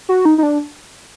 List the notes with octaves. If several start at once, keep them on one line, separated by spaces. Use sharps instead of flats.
F#4
D#4
D#4
D4